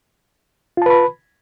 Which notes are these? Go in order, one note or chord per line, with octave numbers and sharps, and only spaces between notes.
F4 B4 A5 B5